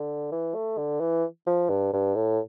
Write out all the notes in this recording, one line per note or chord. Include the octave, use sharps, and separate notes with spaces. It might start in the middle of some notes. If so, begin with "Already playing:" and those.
Already playing: D3
E3
A3
D3
E3
F3
G2
G2
A2